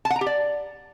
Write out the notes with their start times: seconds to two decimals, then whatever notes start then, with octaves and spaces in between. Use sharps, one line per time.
0.05 A5
0.10 F#5
0.16 A#5
0.21 G4
0.26 D5